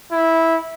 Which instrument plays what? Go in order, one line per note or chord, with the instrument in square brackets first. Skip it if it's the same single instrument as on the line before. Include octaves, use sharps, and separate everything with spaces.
[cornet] E4